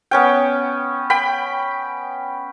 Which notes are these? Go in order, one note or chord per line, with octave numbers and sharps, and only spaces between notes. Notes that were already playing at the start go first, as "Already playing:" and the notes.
B3 C#4 G5
G5 B5